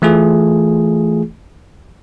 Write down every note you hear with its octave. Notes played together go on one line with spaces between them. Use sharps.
E3 A3 F4 G#4